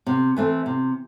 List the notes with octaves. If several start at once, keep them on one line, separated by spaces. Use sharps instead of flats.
C3
E3 A3 C4
C3